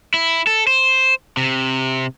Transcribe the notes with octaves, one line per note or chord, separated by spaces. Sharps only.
E4
A4
C5
C3